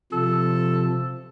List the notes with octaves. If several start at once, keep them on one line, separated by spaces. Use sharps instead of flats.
C3 F3 A4